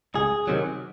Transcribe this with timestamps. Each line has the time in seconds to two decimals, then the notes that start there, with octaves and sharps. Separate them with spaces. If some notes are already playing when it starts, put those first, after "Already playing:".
0.15 C#2 G#4
0.47 C3 D#3 F#3